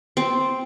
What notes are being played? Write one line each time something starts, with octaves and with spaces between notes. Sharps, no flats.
C4